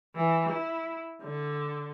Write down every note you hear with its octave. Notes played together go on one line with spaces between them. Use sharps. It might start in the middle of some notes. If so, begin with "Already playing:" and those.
E3
E4
D3